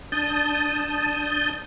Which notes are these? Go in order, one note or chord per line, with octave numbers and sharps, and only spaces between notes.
D4 A5 D#6 G6